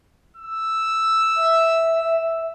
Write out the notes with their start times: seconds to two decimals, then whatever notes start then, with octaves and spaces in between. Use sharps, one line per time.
0.37 E6
1.36 E5